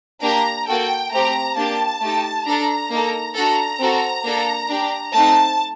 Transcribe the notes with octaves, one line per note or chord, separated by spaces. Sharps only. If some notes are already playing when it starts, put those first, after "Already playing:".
A#3 D4 G4 A#5
A#3 F#4 A4 G5
A3 C4 G4 A#5
A#3 D4 G4 A5
A3 D#4 G4
D4 A4 A#5
A#3 D#4 A4
D4 F#4 A4 A#5
C4 F#4 A4
A#3 D4 A4
D4 G4
A3 C4 D#4 A5